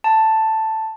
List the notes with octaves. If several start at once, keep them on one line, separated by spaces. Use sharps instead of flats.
A5